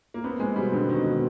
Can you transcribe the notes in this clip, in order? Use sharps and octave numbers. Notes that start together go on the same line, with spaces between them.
A#3
B3 C4
G#3 C4
B2 G3
D3 C4
B2 D#3
B2